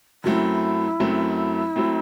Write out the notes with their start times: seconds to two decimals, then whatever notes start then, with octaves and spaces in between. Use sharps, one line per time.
0.24 F#2 F#3 A3 C4 E4
1.00 F#2 F#3 A3 C4
1.76 F#3 A3 C4